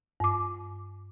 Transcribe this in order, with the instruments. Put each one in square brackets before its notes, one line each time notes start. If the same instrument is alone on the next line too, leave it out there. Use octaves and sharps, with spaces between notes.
[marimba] G2 D6